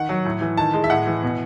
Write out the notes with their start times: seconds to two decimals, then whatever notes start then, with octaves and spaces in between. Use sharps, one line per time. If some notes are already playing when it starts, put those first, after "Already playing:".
Already playing: D#3 F#5
0.09 F#3
0.25 A2
0.41 E3
0.57 D#3 A5
0.73 G#3
0.84 E5
0.90 A2 F#5
1.07 E3
1.23 B2